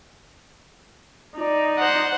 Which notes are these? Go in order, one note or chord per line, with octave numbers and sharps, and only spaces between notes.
D#4 D5
C5 F#5